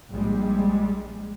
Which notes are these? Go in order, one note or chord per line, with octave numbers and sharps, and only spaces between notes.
A#1 G3 G#3